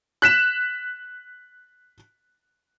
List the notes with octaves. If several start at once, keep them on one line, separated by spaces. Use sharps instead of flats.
F#6 B6 E7